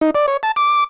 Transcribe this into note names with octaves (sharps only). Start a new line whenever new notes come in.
D#4
D5
C#5
A5
D6